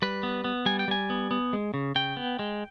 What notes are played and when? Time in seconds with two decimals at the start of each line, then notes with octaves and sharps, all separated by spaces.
0.02 G3 B4
0.23 B3
0.44 B3
0.66 G3 G#5
0.79 G5
0.88 G3 G#5
1.10 B3
1.31 B3
1.53 G#3
1.74 C#3
1.95 C#3 G5
2.17 B3
2.39 G#3